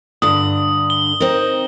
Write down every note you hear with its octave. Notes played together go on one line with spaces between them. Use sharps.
G2 D3 D#6
G7
C4 D#4 A#4